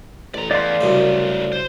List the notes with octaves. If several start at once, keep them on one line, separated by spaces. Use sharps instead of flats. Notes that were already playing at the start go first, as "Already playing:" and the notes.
A1 D5 A#5
E2 D5 F5 C6
C2 F#2 C#3 A3 D#4
C5